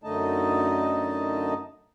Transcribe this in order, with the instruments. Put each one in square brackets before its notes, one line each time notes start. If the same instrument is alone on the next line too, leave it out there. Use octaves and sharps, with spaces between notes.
[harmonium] F#2 D3 A3 D#4 D#5 A5